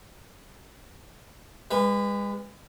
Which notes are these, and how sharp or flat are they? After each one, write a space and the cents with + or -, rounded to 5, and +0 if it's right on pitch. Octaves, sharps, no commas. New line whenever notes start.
G#3 -40 B4 +0